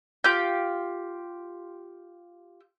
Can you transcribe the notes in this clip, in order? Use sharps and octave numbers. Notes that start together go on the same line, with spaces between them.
F4 G4 G6